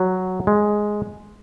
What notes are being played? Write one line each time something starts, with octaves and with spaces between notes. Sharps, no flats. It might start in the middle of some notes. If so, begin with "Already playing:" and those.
Already playing: F#3
G#3